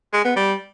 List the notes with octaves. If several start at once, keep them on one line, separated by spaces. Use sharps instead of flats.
G#3
B3
G3